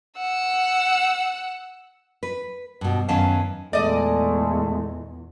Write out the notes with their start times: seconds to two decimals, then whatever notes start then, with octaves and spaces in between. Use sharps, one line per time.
0.18 F#5 E6
2.23 B4
2.81 G2 B2
3.08 F#2 D#3 B3 C#4 F5 A5
3.73 E2 A#2 G#3 A3 D5 D#5